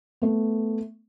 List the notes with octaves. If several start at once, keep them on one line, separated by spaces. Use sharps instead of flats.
A3 B3